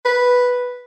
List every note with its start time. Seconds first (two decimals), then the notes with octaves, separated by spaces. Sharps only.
0.05 B4